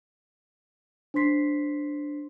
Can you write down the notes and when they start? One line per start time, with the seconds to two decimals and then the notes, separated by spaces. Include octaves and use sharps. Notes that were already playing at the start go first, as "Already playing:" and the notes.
1.14 D4 C5 C6 B6 C7